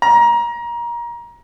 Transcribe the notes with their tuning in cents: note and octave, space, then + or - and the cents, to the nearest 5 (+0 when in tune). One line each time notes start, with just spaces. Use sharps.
A#5 +25